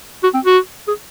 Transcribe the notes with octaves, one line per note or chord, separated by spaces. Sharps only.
F#4
C4
F#4
G#4